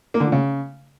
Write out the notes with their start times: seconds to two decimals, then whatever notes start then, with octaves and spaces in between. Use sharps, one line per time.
0.14 A#3
0.20 D3
0.26 F3
0.32 C#3